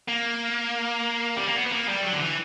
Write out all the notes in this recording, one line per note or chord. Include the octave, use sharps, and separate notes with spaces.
A#3
G3
A#3
B3
B3
A#3
G3
F#3
D3
E3